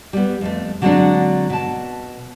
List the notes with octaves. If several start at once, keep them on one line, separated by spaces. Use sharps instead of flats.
G3 B3
F2 A3
D3 F#3 G#3 A3 C4 D4
B2 A5